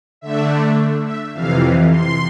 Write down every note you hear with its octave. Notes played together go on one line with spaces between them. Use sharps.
D3 A3 D4 E5
E5
F2 C3 E3 F5
C6